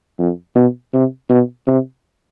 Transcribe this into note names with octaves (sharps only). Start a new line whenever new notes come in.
F2
B2
C3
B2
C3